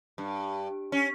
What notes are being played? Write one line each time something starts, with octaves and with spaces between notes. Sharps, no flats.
G2
C#4